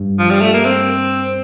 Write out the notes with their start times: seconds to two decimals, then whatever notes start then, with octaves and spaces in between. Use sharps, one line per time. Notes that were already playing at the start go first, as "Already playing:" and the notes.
Already playing: G2
0.19 F3
0.30 G3
0.41 A3
0.53 A#3
0.65 C4